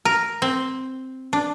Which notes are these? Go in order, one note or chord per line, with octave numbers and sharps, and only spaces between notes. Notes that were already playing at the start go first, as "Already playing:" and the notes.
A#4
C4
D4